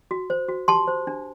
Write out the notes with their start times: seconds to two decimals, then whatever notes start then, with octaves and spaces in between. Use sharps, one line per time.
0.11 F#4
0.30 C5
0.48 F#4
0.68 G4 A5 C6
0.88 C5
1.07 D4